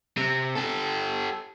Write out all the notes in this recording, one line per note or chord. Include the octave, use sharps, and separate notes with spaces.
C3
G4 A4